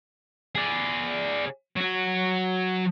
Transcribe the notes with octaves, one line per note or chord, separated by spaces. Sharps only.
G#4 D5
F#3 F#4